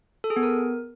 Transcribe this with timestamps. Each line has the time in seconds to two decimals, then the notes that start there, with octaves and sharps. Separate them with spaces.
0.24 A4
0.30 G#4
0.36 B3
0.43 A#4